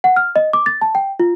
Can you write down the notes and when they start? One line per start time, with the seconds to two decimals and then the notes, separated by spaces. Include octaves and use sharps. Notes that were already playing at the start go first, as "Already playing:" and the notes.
0.04 F#5
0.16 F6
0.36 D#5
0.53 D6
0.66 A6
0.81 A5
0.95 G5
1.20 F4